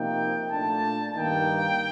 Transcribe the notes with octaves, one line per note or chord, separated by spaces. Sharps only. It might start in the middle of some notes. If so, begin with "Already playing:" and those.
Already playing: C3 F3 A#3 D#4 G5
A#2 A3 D4 A5
G2 D#3 A#3 D#4 G5